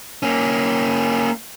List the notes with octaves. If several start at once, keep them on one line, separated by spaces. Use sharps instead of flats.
A#3 C#4